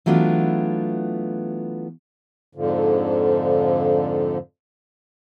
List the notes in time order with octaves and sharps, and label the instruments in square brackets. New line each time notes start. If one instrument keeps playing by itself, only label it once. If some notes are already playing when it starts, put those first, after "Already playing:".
[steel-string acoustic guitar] E3 F#3 A3 B3 D4 F4
[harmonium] F2 G#2 D3 F3